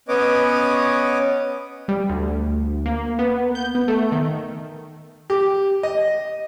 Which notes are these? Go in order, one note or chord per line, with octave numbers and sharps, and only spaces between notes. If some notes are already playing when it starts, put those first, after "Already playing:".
B3 C#4 B4 C#5 D#5 D6
G3
D2
A#3
B3
G6
B3
A3
D#3
G4
D#5